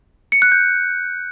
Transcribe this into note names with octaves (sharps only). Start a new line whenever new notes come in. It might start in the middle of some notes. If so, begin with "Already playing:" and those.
C#7
F#6
G6